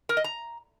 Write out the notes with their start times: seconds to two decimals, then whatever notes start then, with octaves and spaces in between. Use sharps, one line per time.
0.09 A#4
0.17 D#5
0.24 A#5